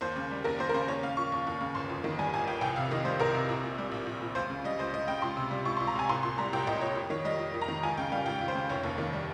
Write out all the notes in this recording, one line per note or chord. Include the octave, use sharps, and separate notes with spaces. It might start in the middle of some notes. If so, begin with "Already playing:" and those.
D#2 C5
C#3
G3
D#2 A#4
D#2 C5
A#4
C#3 C5
D#2 C#5
C#3 F5
F3 C#6
D#2
D#2
C#3
G1 C6
F2
D#3
G3 G#5
G1 G#5
F2 G5
C2 G5
C3 F5
D#3 D#5
G3 C5
C2 A#4
C3
A#1
A#2
G3
A#1
A#1
A#2
C#2 C5
C#3
G3 D#5
C#2 C5
C#2 D#5
C#3 G5
C#2 C6
C3
G3
C#2 C#6
C6
C#2
A#5
C3 G#5
C2 C6
A#2 C6
G3 A#5
C2 G5
C2 D#5
A#2 C#5
F2
D#3 C#5
G3 D#5
F2
F2
A#5
D#3
C#2 G#5
C#3 G5
G3 F5
C#2 G5
C#2
C5
C#3
F1 C#5
D#2
D#3
G3